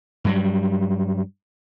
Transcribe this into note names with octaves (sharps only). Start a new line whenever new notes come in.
G2 F#3 G3